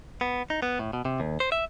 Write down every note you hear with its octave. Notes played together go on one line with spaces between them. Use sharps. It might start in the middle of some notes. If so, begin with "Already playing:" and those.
B3
D#4
B3
A2
B2
C3
D#2
C5
E5